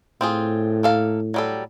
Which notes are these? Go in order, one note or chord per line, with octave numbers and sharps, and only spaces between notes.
A2 C4 F4 G#4
A#3 A4 F5
F#3 G3 A4